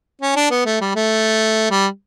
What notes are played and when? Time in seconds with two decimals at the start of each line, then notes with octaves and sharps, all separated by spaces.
0.21 C#4
0.36 D4
0.51 B3
0.66 A3
0.81 G3
0.95 A3
1.71 G3